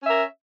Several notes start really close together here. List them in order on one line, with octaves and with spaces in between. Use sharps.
C#4 E5 A#4